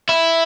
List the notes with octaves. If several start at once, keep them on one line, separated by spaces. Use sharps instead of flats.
E4